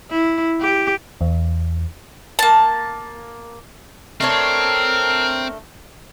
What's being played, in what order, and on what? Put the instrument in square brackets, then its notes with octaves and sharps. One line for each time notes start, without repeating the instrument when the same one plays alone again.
[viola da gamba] E4
G4
[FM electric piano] E2
[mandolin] A#3 A5
[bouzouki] A3 D4 C#5 [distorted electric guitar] C4 [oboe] A#4